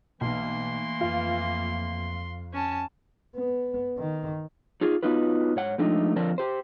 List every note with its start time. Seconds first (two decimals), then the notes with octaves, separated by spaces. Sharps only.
0.21 B1 E3 A3 A#3 C6
1.01 F2 F4
2.53 C#4 A5
3.36 B3
3.97 D#3
4.81 D#4 F4 G#4
5.03 B3 D#4 F4 F#4 B4
5.56 G#2 C#5 F#5
5.78 F3 G#3 A3 D4 D#4
6.16 D3 F3 C4 A#4 D5 A5
6.38 G4 C5